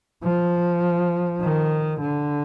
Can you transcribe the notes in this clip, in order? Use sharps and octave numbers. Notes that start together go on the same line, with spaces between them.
F3
D#3
D3